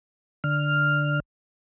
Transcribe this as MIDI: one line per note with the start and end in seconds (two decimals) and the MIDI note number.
0.44 1.20 50
0.44 1.20 89